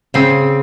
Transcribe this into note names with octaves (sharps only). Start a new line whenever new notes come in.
C#3 C4